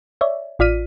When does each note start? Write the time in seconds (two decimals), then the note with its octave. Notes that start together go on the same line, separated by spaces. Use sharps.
0.21 C#5 D5 E5
0.59 A1 F4 D5 F6 B6 D#7